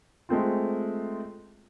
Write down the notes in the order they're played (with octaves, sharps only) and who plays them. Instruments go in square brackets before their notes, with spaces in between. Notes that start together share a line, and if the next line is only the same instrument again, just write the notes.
[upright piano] G#3 A3 C4 F4